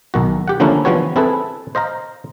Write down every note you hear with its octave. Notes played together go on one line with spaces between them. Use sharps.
B1 D#3 F#4
G4 F#5
D3 F3 A#3 C#4 D4 E4
E3 F3 G3 B3 F#4 C#5
C4 E4 G#4 A4 B4
C5 D#5 F5 A#5